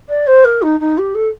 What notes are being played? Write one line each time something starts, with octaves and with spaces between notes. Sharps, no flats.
D5
C5
A#4
D#4
D#4
G4
A4